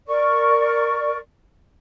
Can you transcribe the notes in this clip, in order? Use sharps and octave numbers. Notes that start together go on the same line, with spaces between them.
A#4 D5 C#6